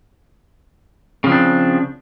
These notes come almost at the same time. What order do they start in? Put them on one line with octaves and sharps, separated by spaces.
C#3 F3 C4 D4